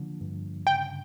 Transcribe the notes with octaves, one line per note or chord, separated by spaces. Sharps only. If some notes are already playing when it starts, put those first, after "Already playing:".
Already playing: D3 F3 A#3
G2
C#3 G5